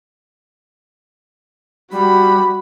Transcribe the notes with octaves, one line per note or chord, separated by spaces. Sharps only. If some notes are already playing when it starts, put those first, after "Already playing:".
G3 F#4 B5